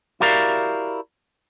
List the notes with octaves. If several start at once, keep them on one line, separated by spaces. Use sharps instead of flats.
E4 F#4 G4 A#4 D5 F5